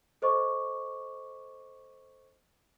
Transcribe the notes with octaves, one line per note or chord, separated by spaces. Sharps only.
A4 C5 D#5 C#6 D6